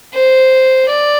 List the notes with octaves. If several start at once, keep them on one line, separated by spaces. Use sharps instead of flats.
C5
D5